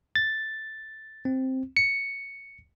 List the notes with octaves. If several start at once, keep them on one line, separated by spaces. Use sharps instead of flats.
A6
C4
C#7